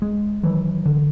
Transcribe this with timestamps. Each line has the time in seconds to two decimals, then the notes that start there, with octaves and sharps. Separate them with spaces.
0.02 G#3
0.43 D#3 E3 F#3
0.86 D3